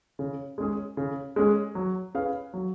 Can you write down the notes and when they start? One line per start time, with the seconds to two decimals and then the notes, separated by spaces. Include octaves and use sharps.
0.19 C#3
0.58 G#3 C#4 G#4
0.97 C#3
1.36 G#3 C#4 G#4
1.75 F#3
2.14 C#4 G#4 B4 F5
2.54 F#3